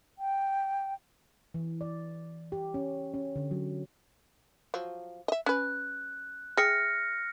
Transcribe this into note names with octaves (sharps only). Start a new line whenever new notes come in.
G5
E3
D5
G4
C#4
C#4
D3
F#3
F3 F#3
D#5 E5
C#4 B4 F#6
G#4 E5 G5 F6 A#6 C#7